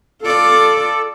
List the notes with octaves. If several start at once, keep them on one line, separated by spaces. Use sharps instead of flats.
F4 A4 D5